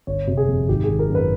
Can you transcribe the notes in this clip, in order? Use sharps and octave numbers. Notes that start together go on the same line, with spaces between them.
G1 C#5
C3
G#4
F2
G#1 G4
G#4
D#3
A#4
F#2
B4